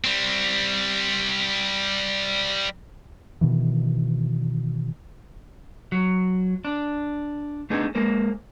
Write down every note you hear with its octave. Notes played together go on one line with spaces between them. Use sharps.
G3 C4
B2 D#3 E3
F#3
D4
A3 B3 D4 D#4 G#4 A4
G#3 A#3 A#4 C5